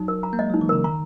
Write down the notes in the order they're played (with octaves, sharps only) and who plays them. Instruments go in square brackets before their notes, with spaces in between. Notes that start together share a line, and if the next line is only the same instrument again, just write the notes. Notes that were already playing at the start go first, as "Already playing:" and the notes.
Already playing: [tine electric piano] F#3 [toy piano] D#4
[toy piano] A#4
A#5
[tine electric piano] A#3
[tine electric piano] G#3 [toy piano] D#5
[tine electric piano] F#3 [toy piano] D#4
[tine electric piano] E3
[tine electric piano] C#3 [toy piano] A#4
[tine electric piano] D#3 [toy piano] A#5